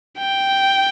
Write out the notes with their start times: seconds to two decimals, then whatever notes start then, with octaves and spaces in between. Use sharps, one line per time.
0.19 G5